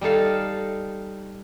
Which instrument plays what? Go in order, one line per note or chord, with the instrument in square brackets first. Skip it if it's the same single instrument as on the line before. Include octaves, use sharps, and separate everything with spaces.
[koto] G3 D#4 A4 F5